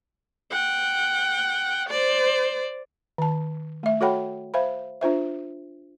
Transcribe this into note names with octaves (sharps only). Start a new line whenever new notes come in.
F#5 G5
C5 D5
D#3 A5
A3 E5
F#4 A4 C#5 F#5 G5 B5
C5 E5 F5 B5
D4 F4 C5 E5